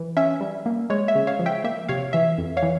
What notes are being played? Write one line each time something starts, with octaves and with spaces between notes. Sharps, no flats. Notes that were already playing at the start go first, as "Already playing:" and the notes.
Already playing: E3
C#4 E5
G3
A#3
G#3 C#5
E5
C#3
C#5 F5
F3
E5 G5
A#3 E5
C3 C#5 F5
E3 E5
F2
C#5 F5
E3